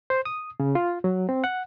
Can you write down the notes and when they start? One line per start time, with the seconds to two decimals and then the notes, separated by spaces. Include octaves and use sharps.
0.10 C5
0.25 D#6
0.60 C#3
0.75 F4
1.04 F#3
1.29 C4
1.44 F#5